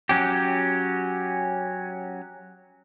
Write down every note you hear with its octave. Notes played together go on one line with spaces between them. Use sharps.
F#3 C#4 G4